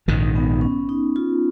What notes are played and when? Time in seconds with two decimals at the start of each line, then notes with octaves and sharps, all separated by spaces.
0.08 A#1 G#2 D#3
0.36 B3
0.61 C#4
0.89 D#4
1.16 F4